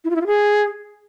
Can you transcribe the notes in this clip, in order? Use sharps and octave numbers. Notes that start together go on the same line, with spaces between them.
E4
F4
E4
F4
G#4